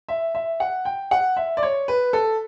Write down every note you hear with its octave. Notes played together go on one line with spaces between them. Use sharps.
E5
E5
F#5
G5
F#5
E5
D5
C#5
B4
A4